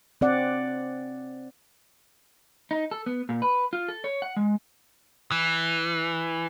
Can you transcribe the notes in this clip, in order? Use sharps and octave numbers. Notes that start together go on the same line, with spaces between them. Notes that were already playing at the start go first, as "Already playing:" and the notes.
C4 D5 F#5
D#4
A4
B3
A#2
B4
F4
A4
C#5
F#5
G#3
E3